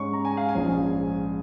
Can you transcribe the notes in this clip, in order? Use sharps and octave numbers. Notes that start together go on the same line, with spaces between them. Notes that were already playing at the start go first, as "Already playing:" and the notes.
Already playing: G#2 G#3 C#4 C#6
A#5
G#5
F5
G#5
A#1 G#2 F3 C#4